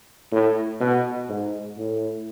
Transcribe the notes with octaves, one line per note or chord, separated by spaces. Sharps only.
A2
B2
G#2
A2